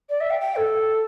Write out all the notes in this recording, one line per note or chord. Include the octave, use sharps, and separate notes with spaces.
D5
E5
G5
G5
A4